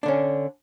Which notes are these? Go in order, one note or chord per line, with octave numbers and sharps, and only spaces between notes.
D3 C#4 D4